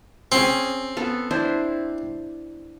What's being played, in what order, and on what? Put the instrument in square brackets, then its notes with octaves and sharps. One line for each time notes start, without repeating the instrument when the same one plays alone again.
[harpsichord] C4 [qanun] C#4 G#4
[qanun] B3 A4
D4 E4 C5